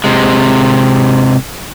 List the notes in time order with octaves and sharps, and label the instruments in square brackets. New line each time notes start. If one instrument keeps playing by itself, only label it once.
[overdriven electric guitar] C3 G#3